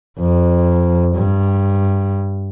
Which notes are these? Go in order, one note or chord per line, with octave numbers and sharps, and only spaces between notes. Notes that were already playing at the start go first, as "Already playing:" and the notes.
F2
G2